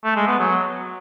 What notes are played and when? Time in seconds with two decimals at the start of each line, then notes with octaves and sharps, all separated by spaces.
0.04 A3
0.16 G#3
0.27 B3
0.39 F#3